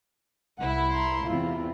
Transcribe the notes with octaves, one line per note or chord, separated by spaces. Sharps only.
C2 E4 F#5
A#5 C6
E2 C3 E4 F4